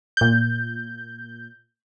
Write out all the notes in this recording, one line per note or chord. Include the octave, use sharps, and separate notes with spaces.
A#2 G6